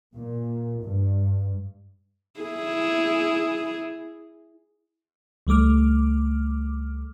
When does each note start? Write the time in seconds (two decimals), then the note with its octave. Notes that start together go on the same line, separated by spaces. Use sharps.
0.15 A#2
0.83 G2
2.40 E4 G#4
5.47 C#2 G3 A3 D6 F6